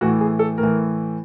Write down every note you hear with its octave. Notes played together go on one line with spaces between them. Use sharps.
A2 E3 F#4
G#4
A4
A2 A#4
E3